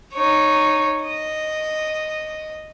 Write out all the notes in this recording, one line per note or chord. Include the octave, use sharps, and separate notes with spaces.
D#4 C#5
D#5